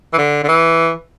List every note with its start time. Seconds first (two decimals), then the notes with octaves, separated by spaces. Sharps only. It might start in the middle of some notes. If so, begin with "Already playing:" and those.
0.13 E3
0.18 D3
0.44 D3
0.48 E3